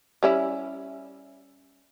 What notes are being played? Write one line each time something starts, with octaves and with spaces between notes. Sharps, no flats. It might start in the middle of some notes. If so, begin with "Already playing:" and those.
G3 C#4 E4